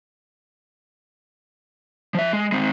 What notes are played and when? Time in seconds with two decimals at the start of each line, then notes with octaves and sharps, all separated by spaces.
2.15 F3 E5
2.33 G#3
2.52 G#3 C4